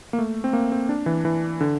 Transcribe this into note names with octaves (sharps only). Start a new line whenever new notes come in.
A#3
A3
C4
A#3
C4
D4
E3
E3
D3